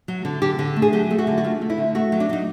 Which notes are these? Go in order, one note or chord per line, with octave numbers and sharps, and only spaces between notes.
F#3
D3
D3 G4
D3
A3
G#4
F#3 G4
A3
F#4
D3
F#4
A3 F4
A3
E4
D3
A3 F#4
F#3
D4
F#3 D#4